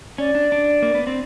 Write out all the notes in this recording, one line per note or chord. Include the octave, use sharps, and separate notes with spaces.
C#4 D5
D4
D4
A#3
B3
C4